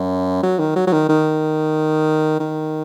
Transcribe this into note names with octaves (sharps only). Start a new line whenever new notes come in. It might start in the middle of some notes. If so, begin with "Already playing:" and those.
Already playing: F#2
F#3
D#3
F#3
F#3
D#3
D#3
D#3